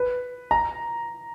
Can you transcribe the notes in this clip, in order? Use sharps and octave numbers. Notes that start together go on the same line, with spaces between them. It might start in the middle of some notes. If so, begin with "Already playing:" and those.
Already playing: B4
A#5